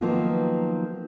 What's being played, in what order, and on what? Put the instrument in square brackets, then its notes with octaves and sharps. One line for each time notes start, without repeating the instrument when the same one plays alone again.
[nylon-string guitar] D#3 F3 F#3 A#3 B3 F4